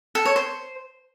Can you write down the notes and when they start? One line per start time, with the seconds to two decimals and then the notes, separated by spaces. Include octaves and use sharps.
0.15 A4
0.25 C#5
0.36 C5